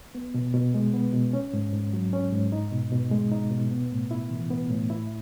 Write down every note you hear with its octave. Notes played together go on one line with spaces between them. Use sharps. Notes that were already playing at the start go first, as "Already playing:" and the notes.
B3
B2
B2
G#3
B3
B2
C#4
G#2
G#2
F#3
C#4
G#2
D#4
B2
B2
G#3
D#4
B2
B3
A2
E4
E3
B3
A2
E4